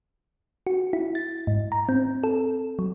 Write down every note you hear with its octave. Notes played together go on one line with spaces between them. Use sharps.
F#4
E4
A6
G#2
A#5
C4
A4
F#3